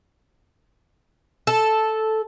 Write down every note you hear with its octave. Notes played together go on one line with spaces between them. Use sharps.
A4